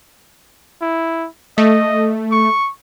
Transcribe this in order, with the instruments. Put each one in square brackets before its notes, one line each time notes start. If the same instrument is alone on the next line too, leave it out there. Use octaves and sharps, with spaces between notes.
[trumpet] E4
[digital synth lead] A3 [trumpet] D#5
[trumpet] C#6